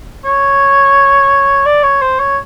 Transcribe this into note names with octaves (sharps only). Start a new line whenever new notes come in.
C#5
D5
C#5
C5
C#5